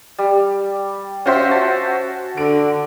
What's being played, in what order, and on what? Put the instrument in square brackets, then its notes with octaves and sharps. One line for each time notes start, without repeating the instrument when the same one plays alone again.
[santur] G3
[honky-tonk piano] C#4 C5 E5 [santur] F4 F#4
[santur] F#4 A5
[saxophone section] D3 [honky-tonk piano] D7